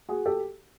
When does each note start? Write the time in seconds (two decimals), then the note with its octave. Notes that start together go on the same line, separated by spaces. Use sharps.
0.09 F#4 G#4
0.26 G4 A4